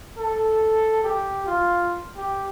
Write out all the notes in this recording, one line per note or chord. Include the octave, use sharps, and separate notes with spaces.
A4
G4
F4
G4